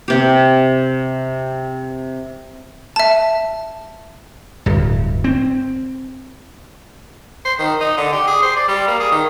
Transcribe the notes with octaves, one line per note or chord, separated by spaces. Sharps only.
C3 G4
E5 A5
D1 G2
C4
C5
D#3
D#4
D3
G4
G#4
C5
D5
G3
A#3
G#4
D#3